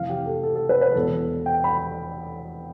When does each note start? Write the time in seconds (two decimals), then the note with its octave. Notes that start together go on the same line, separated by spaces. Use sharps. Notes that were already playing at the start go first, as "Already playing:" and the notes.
Already playing: F1 F2 E3 F5
0.09 G4
0.26 A4
0.43 A4
0.55 A4
0.69 B4
0.81 B4
0.94 E1 E2 B2 A4
1.46 G5
1.64 B5